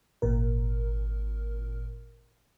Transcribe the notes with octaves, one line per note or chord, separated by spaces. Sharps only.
G#1 A#2 A#4